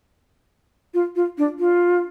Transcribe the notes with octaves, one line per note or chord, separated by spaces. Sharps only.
F4
F4
D4
F4